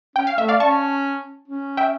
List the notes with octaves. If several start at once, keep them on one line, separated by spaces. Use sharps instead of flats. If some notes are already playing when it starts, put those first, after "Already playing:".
C#4 G5
F5
A3 E5
D5 F5
C#4 A5 C#6
C#4
E5 G5